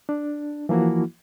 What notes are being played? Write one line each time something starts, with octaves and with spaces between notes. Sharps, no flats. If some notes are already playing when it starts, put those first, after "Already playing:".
D4
E3 F3 A#3 E4 F#4